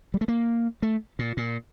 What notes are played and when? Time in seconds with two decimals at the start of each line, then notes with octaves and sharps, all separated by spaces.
0.14 G3
0.21 A3
0.28 A#3
0.82 A3
1.19 A#2
1.37 A#2